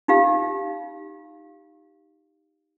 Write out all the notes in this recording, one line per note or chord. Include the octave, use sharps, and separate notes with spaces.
D#4 F4 G4 F5